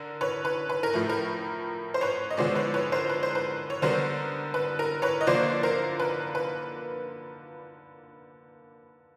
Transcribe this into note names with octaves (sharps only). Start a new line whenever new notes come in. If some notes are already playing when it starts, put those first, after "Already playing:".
Already playing: D3 A#4
B4 C#5
B4
B4
A#4
A2 F3 A3
A#4
C5
B4 C#5
D#5
D3 F3 G#3 B3 C5 D5
B4 C#5
B4 C#5
A#4 C5
B4
C5
B4
C#5
D3 G3 B3 A#4 C5
B4
A#4
B4 C#5
D#5
D3 F3 A#3 C5 D5
A#4 C5
B4
B4